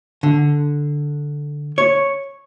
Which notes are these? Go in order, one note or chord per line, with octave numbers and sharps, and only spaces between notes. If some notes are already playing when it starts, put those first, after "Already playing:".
D3
C#5